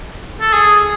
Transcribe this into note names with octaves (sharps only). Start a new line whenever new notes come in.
A4
G#4